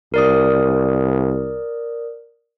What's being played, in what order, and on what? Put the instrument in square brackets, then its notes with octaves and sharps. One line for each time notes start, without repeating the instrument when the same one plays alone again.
[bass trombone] C2 [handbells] A#4 D5 D#6